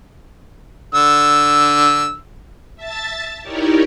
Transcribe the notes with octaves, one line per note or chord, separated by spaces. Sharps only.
D3 E6
E5 A5 A6
D#4 E4 G4 A#4 C#5 D5